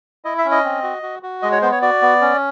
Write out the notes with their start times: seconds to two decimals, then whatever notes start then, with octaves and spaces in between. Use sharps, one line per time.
0.25 E4 D#5
0.38 E5
0.45 C#4
0.51 D#5
0.64 C4
0.83 F#4
1.03 F#4
1.23 F#4
1.42 G#3 D#5
1.52 C#5
1.62 B3 C5
1.72 C#5
1.82 F#4 D5
2.02 B3
2.21 C#4